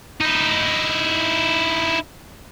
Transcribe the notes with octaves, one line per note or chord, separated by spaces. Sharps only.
D#4 E4